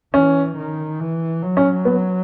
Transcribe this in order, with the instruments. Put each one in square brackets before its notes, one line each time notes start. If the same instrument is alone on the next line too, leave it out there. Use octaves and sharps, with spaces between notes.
[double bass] E3 [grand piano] C#4
[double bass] D#3
E3
F#3
[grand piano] C#4
B3